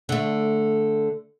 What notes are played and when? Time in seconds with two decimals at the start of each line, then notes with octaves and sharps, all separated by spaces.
0.09 D3 A3